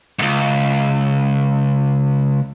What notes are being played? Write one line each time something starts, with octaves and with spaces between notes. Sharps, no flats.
C#2 G#2